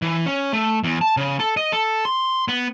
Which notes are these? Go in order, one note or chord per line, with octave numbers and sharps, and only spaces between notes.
E3
C#4
A3
E2
A5
C#3
A4
D#5
A4
C6
B3